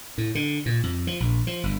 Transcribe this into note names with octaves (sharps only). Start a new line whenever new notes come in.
A2
D3
A#2
F2
F3
A#1
F3
G1